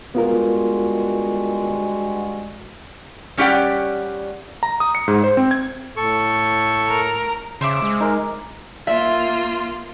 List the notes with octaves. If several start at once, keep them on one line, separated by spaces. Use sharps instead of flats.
G2 G#3 B3 F4 F#4 A#4
G3 C#4 G4 D5 F#5 G5
A#5
D#6
C#7
G#2
C5
C4
G#6
A2 A4 C#6
A#4
C#3 C5 E5 D6
G#3
D#4 A#4
A#3 F4 E5